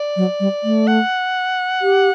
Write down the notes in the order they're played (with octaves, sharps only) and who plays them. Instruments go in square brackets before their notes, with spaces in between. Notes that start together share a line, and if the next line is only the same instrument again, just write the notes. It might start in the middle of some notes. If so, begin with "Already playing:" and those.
Already playing: [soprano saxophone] D5
[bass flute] F#3
G3
A3
[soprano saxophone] F#5
[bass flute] G4